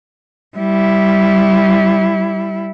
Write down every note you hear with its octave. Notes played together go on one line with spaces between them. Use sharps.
G3 E4